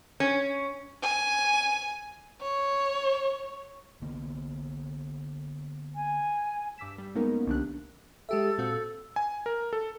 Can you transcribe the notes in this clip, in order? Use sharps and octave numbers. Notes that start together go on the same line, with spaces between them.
C#4
G#5
C#5
D3 A#3 B3
G#5
G2 D6 E6 B6 E7
G3
G#3 A#3 B3 C#4 D#4 A#4
C2 D3 F3 D4 G4 F#6
G#3 G4 A4 E5
A#2 C4 F#4
G#5
A#4
A4